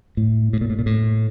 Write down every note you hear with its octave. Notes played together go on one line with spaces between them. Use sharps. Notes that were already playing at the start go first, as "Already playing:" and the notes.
A2
A2
A#2
A2
A#2
A2